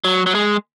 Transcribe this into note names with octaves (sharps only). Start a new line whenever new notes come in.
F#3
F#3
G#3